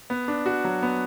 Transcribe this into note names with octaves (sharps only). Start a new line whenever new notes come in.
B3
D4
F#4
F#3
B3